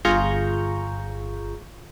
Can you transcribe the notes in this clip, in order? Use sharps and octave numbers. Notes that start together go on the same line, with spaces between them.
G1 F4 G#4 A#5 C#6 G6